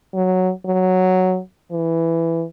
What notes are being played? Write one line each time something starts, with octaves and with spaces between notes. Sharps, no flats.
F#3
F#3
E3